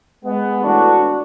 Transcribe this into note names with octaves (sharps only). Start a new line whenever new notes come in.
G#3 B3
A2 E3 D4 F#4